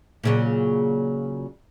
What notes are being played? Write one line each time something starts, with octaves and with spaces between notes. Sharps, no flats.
A#2 C#3 F#3